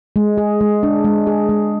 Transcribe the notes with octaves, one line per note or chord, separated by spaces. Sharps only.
G#3
G#4
G#3
D4
G#3
G#4
G#3